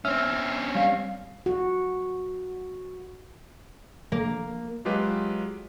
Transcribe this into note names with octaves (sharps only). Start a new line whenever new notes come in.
C4 C#4 E5 E6 F6
G3 F5
F#4
A#3
F#3 G#3 F4 G4 B4 D#5